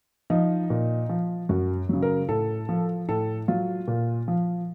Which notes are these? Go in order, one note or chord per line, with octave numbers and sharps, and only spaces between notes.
F3 D#4
A#2
F3
F#2 F#4
C#3 F#3
A#4
A2 A4
F3
A2 A4
F#3 F4
A#2
F3